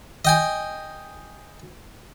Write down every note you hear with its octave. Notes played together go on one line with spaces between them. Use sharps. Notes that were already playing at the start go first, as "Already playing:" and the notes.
D#5 G5 G#5